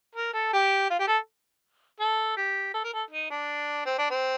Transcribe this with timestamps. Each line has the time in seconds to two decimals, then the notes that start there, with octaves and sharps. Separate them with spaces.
0.15 A#4
0.34 A4
0.53 G4
0.90 F4
0.99 G4
1.07 A4
2.00 A4
2.37 G4
2.74 A4
2.84 A#4
2.93 A4
3.11 D#4
3.30 D4
3.86 C4
3.98 D4
4.10 C4